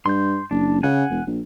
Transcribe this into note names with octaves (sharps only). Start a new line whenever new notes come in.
G2 C6 G6
F#1 D4
C#3 F#5 G#5
E1
A#1